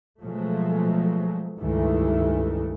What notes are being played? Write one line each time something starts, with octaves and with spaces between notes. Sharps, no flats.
B2 F3 F#3 G#3 A3
C#2 G2 D#3 E3 A3